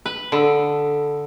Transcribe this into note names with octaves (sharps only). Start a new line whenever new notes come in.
B4
D3 A4 B5 E6